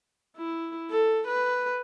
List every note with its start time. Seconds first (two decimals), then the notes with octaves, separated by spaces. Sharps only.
0.37 E4
0.91 A4
1.27 B4